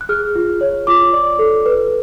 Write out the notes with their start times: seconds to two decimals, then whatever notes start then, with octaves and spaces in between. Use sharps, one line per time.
0.01 F#6
0.09 G#4 F6
0.35 F4
0.61 C#5
0.87 F4 D6
1.13 D5
1.39 A4
1.66 B4